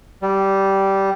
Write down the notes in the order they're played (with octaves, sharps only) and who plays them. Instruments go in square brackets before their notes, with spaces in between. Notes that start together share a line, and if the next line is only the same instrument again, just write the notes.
[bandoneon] G3